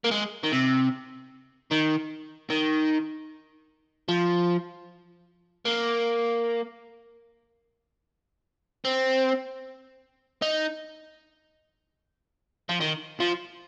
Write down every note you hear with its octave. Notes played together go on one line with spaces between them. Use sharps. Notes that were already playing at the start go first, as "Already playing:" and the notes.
A#3
G#3
D#3
C3
D#3
D#3
F3
A#3
C4
D#4
F3
D#3
F3